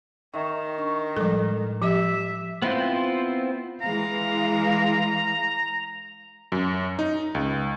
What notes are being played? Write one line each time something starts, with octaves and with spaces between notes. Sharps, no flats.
D#3 E5 C#6
D4 C#6
A2 F3 G3 G#3 A4
F3 G4 E5
B3 C4 E4 F4 C5
E3 G#3 F5 A#5
F#2
D#4
C#2